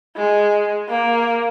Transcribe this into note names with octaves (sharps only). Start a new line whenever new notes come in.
G#3
A#3